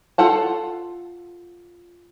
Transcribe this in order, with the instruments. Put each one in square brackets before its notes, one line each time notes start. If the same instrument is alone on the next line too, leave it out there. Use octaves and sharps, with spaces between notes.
[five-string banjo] F4 A4 F#5 A5